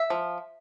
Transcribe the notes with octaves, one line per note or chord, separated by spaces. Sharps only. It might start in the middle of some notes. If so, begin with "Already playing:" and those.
Already playing: E5
F3